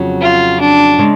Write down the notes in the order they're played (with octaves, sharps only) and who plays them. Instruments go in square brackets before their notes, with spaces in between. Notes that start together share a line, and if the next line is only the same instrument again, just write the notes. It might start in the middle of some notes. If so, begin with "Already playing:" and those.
Already playing: [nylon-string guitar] F2 C#3 F#3
[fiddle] F4
D4
[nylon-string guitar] C#3 G#3